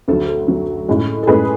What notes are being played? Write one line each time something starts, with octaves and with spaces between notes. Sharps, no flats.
D2 D3 F#3 A4
A4
D2 D3 F#3
A2 G#3 C#4
A4
A2 G#3 C#4 G#4 B4